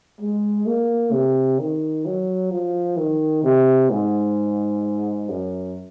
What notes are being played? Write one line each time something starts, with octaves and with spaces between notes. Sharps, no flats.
G#3
A#3
C3
D#3
F#3
F3
D#3
C3
G#2
F#2